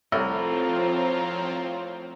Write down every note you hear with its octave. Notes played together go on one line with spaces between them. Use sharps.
C2 A2 F3 C4 F4 C#5 A#5